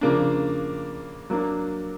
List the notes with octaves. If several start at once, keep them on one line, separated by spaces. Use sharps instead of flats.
C#3 F3 A#3 D4
F#3 A#3 D4